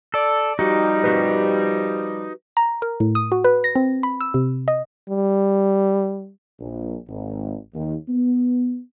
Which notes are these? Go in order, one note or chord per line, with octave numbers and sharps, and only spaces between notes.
A4 D5
F3 G3 D#4 F#4 G4
F#4 G4 B4
A#5
A#4
A2
D#6
F#4
B4
A#6
C4
B5
E6
C3
D#5
G3
A#1
G#1
D#2
B3